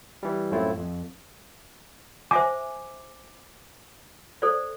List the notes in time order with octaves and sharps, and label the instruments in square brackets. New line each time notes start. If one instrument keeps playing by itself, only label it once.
[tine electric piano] E3 G3
F#2 A2 A3 C4 E4 F4
F2
[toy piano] C5 E5 G#5 [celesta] D6
[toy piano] A4 C5 D5